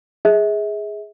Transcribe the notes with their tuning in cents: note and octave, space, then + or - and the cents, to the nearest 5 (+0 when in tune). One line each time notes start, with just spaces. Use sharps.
G#4 +0 E5 -40